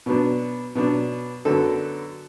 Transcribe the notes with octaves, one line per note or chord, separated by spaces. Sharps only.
B2 F#3 B3 D4
B2 F#3 B3 D4
F#2 D3 F#3 B3 A4